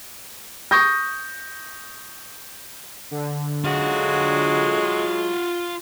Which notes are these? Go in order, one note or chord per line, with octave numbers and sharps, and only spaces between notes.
C#6 D#6 G6 A#6
D3
F#3 G#3 F4 F#5